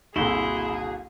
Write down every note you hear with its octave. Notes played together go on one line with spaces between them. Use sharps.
F#1 C2 A#2 D3 E4 F#4 G#4 C6